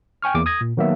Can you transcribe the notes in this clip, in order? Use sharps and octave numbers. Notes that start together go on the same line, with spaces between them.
G5 G#5 C#6 F6
E2 A#3 D6
D#6 G#6 A#6
A#2
D#3 F#3 A#3 B3 E5